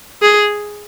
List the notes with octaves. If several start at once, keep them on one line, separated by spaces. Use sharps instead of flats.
G#4